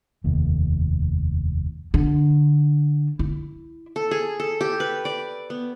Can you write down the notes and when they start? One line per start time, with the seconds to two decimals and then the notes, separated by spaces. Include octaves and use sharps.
0.24 F1 D#2
1.94 D3
3.19 E4
3.96 A4
4.11 G#4
4.40 A4
4.61 G4
4.80 B4
5.05 D5
5.50 B3